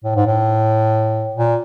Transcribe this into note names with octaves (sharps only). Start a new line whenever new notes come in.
A2
G#2
A2
A#2